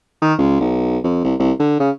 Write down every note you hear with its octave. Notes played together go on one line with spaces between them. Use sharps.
D#3
C#2
B1
F2
C2
C2
D3
C#3